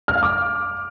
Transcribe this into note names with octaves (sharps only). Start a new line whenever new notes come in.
F6
F5
D6